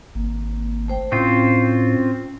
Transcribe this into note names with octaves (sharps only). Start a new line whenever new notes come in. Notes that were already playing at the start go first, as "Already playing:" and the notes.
G#1 A#3
A3 C5 G5
A2 C4 C#4 F4